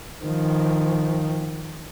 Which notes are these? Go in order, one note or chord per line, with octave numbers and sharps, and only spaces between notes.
D#3 F3